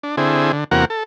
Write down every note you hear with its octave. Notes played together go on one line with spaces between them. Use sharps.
D4
D3 C4 E4 G#4
D3
E2 C3 A#3 F#4 A#4 F#5
A4